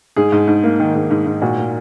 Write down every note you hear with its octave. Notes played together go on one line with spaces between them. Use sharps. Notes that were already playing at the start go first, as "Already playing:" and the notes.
G#2 G#4
G#2
G#2
A#3
D#3
G#2
G#2
G#2
A#2 F#4
A#3